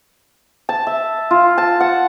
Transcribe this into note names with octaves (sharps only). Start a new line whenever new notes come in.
A5
E5
F4
A5
F#5